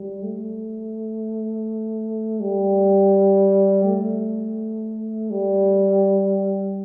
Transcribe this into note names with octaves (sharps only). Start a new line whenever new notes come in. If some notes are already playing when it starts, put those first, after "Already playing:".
Already playing: G3
A3
G3
A3
G3